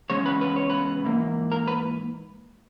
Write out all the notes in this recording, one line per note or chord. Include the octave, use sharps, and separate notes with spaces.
E2 C#3 G#3 C#4 C#5
B4
B4
C#5
B4
G#2 E3 A#3
A#4
B4